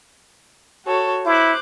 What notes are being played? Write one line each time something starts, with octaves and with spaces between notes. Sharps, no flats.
F#4 A4 C#5
E4 C5 D6 F#6